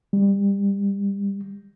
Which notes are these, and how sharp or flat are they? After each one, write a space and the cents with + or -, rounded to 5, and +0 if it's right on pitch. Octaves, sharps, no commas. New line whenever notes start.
G3 +25